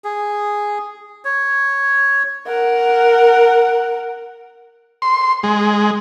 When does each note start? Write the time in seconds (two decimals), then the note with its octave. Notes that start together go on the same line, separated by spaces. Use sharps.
0.04 G#4
1.25 C#5
2.47 A#4 F#5
5.02 C6
5.43 G#3